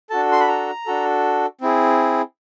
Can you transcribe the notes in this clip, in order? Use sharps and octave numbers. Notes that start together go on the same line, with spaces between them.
D4 F#4 A4 A5
C6
B5
A#5
D4 F#4 A4
C4 E4 G#4